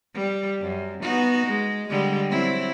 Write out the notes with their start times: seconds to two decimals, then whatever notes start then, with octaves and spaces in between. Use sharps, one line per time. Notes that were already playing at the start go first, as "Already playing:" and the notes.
0.15 G3
0.62 F#2
1.02 B3 D#4 F#4
1.47 G#3
1.89 D3 G3 G#3
2.30 F#3 C4 E4